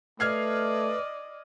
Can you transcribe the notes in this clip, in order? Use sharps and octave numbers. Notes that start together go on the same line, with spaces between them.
A3 B4 D5 D#5 F6 G#6 C7